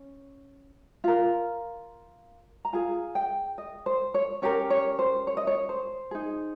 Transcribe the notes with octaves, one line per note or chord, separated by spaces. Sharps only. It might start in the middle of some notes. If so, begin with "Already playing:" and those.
Already playing: C#4
F4 A#4
A#5
F4 G#4 G#5
G5
D#5
C5
C#5
C#4 G4 A#4 C#5
C#5
C5
C#5
D#5
C#5
C5
D#4 G#4